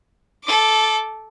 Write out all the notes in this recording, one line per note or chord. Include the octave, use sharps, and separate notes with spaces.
A4 D6